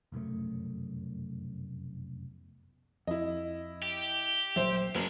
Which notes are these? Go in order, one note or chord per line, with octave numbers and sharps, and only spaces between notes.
F1 B1 F#2 A3
F2 E4 D#5
G4
A#1 F#3 G3 C5 E5
F#1 G#3 D4